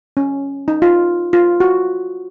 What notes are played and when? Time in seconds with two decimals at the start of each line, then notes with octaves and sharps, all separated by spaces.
0.17 C#4
0.68 D#4
0.82 F4
1.33 F4
1.60 F#4